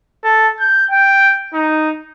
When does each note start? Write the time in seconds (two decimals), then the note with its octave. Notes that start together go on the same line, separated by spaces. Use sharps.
0.24 A4
0.60 G6
0.91 G5
1.54 D#4